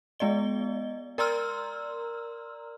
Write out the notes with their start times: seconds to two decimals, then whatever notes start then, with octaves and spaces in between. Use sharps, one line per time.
0.19 G#3 B3 D5 D#5 G7
1.18 A#4 D5 A#5 C6 E6 F6